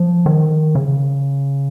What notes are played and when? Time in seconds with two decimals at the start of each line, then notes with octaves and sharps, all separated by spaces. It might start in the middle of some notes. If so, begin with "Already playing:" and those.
Already playing: F3
0.26 D#3
0.75 C#3